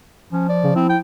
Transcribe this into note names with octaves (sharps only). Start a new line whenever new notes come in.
F3 C#4
D5
C#3
C4 E4
G5